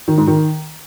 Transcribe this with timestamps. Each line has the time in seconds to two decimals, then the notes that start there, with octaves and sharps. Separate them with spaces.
0.08 D#3
0.18 G#2
0.27 D#3